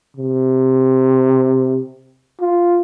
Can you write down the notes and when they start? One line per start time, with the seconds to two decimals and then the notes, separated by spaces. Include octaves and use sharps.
0.16 C3
2.40 F4